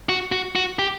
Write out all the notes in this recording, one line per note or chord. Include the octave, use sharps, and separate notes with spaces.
F#4
F#4
F#4
G4